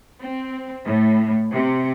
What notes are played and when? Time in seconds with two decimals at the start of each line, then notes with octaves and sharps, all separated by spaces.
0.21 C4
0.84 A2
1.52 C3